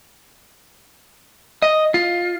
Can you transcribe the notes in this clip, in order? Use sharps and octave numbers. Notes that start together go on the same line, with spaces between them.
D#5
F4